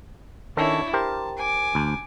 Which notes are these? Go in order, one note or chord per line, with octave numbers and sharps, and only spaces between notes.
D#3 C#4 D4 E4 A4 C#5
G4 A#4 C5 A5
G#5 D6
D2